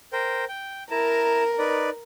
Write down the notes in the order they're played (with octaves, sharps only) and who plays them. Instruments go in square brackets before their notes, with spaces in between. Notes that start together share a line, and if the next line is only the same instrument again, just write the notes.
[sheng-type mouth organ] A#4 C5 G5
G5
[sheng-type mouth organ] E4 A5 A#5 [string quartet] A#4
[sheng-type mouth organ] D#4 B4 D5